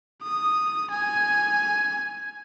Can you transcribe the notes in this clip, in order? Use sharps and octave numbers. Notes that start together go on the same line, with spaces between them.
D#6
G#5